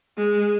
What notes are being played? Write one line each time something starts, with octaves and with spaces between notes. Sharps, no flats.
G#3